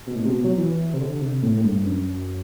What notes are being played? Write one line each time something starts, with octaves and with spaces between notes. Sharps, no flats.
B2
A2
C3
B2
F#3
E3
C3
D3
C3
A2
A2
G2
F#2